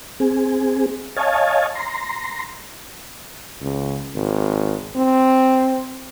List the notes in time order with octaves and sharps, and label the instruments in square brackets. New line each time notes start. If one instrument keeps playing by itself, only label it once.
[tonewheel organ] C4 G#4
C#5 D#5 F5 G#5 A5
A#5 C6
[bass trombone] C#2
G#1
C4